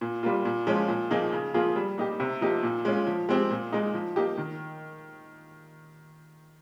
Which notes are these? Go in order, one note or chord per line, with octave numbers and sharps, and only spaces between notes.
A#2
G3 A#3 F4
A#2
F3 G#3 C#4 F4
A#2
F3 A#3 D#4 G#4
C#3
F3 A#3 F4 G#4
G3
A#3 D#4 G4
C3
F3 A#3 D#4 G4
A#2
G#3 C#4 F4
F3
G#3 C4 G4
A#2
G#3 D#4
F3
A#3 D#4 G4
D#3